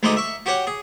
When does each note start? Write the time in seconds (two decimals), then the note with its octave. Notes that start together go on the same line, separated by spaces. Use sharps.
0.03 D2 G#3 A3 D#4 D6 D#6
0.16 E5 C#6
0.46 F#4 G4 C#5 F#5
0.67 G#4